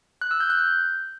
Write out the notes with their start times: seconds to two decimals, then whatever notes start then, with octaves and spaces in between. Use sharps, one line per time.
0.21 F#6
0.31 E6
0.40 G6
0.50 F#6
0.59 G6